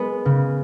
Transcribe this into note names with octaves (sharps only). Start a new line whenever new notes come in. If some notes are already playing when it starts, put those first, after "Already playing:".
Already playing: G#3 B3 B4
C#3